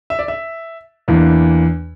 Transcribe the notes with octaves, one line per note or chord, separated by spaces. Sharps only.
E5
D5
E5
E2 E3 A#3 D4